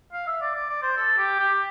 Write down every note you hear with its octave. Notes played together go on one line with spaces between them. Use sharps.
F5
E5
D5
D5
D5
C5
A4
G4
G4